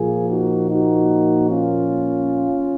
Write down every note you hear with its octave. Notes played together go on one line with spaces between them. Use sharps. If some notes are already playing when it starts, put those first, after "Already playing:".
Already playing: A#2 F3 A#3 F4 G#4
D#4 F#4
D#4 F#4
C#4 F4